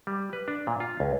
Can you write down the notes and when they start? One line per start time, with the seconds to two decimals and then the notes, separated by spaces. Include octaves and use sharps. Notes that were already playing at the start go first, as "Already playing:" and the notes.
0.07 G3
0.33 B4
0.48 D4
0.67 A#2
0.80 F4
1.00 C#2